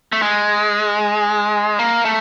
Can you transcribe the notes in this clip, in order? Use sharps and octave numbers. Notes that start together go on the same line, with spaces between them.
A3
G#3
A#3
A3